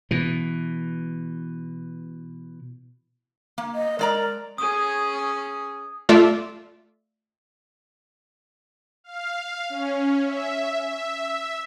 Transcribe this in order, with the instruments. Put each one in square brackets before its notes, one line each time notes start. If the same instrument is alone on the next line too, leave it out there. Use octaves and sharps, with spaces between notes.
[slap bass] B2 E3
[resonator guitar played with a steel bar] A#3
[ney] D#5
[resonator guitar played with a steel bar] G#3 D5 A#5 [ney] A#4
[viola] C#4 G#4 [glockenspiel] D#6
[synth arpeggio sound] A3 F4 D5 E5
[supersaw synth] F5
C#4
E5
E5